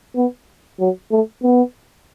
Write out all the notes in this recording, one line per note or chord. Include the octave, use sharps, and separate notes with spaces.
B3
F#3
A3
B3